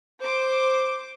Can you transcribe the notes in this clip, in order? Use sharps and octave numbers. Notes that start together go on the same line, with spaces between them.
C5 D6